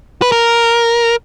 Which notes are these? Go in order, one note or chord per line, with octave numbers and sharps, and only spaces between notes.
B4
A#4